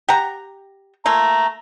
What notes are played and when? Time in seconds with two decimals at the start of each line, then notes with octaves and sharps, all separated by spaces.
0.09 G4 F#5 A#5
1.06 A3 A#3 F4 A#5